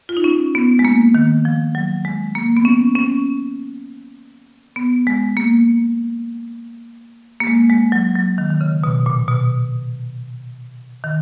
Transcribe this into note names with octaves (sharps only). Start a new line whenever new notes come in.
F4
D#4
C#4
B3
G#3
A#3
D#3
F3
F#3
G#3
A#3
B3
C#4
C#4
B3
G#3
A#3
A#3
G#3
G#3
F#3
F#3
D#3
D#3
C#3
B2
A#2
B2
D#3